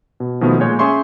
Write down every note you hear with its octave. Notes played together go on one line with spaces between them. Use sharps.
B2
B2 D#3 F3 A3 B3
A#2 G#3 C#5 G6
C#4 G#4 E5 C6 C#6